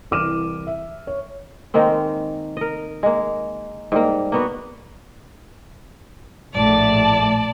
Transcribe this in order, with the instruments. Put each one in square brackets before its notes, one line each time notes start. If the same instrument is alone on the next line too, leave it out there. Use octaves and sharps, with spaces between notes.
[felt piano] C2 E3 D6 F6 D#7 E7
E5
C#5
[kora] D#3 G#3 A#3 C4
A#4 D#5
G#3 A#3
G#2 G3 A#3
A#3 B3 F#4
[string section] A#1 A2 [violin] D5 A5